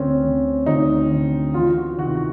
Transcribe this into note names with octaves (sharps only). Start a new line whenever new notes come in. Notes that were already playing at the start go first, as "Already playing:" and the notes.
Already playing: D2 C4 C#4
D3
D2 D#4
D3
E2 F4
F#4
C3 D#3 F#4
F#4